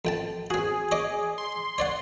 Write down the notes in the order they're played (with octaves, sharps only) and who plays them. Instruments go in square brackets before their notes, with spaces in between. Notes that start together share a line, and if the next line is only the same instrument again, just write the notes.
[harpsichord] F2 G5 A5
[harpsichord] C4 F#4 [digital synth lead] G#4
[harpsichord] C#5 D#5 D6
[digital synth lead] C6
[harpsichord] C#5 D5 F#5